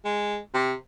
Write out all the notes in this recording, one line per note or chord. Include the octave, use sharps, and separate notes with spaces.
G#3
C3